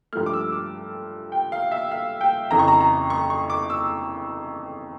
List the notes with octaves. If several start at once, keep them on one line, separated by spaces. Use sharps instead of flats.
G2 F3 A3 F6
D6
E6
D6
G5
F5
E5
F5
G5
F2 C#3 E3 A#5
C#6
A#5
A#5
C#6
C#6
D6
E6